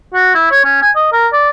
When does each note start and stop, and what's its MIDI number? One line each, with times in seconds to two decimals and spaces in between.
0.14 0.32 66
0.35 0.51 64
0.51 0.61 73
0.65 0.80 61
0.82 0.91 80
0.96 1.09 75
1.13 1.28 70
1.32 1.50 74